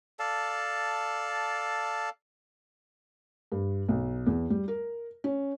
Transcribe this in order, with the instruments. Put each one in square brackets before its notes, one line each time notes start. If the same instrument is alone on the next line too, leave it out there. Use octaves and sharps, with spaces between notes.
[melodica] A4 D5 F5 A5
[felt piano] G2
B1
E2
G3
A#4
C#4